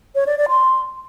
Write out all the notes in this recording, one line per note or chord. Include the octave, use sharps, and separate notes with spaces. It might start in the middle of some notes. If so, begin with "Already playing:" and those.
C#5
D5
D5
C6